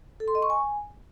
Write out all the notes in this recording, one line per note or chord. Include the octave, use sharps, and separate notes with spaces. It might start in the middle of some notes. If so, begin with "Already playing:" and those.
A4
C6
D#5
C#6
G#5